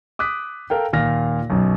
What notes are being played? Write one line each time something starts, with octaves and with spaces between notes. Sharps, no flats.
D6 D#6 F#6 B6
A4 A#4 F5 G5
D#2 A#2 F5 F6 A#6
B1 F#2 B2